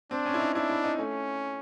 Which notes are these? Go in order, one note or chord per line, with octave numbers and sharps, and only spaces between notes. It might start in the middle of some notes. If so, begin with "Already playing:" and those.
C4 D4
C#4
E4
D#4
D4 E4
E4
D#4
A3 C#4